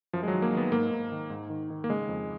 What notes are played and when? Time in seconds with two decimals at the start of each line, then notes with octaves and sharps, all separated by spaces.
0.13 F#2 F3
0.23 G#3
0.28 F#3
0.33 D#3
0.42 A#3
0.52 D#3 B3
0.72 G#2 A#3
0.91 G#2
1.12 D#3
1.30 G#2
1.50 D#3
1.70 D#3
1.84 A#3
1.89 C#3 G#3
2.09 F2